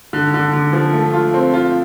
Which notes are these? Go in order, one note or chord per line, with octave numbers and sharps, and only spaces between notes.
D3
D3
D3
F3
A3
F4
C4
F4